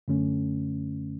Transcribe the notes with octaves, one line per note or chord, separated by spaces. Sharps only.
F#2 D3 A3 C#4